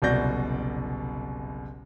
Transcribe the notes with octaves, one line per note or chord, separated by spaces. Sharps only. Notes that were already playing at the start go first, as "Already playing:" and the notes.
F#1 C2 B2 D5 G6 A#6